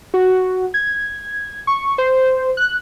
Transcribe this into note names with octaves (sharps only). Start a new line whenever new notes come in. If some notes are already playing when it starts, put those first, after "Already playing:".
F#4
G#6
C#6
C5
F#6